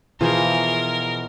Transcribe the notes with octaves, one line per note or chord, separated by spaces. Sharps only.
B2 E3 F3 F4 G#4 A#4 C5